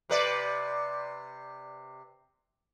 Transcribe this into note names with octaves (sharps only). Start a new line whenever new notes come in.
C3 B4 D5